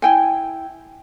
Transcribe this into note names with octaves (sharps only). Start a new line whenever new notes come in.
E4 G5 G#5